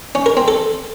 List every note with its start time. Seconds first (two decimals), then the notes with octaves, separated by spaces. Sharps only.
0.15 C#4
0.26 A#4
0.37 C4
0.48 A4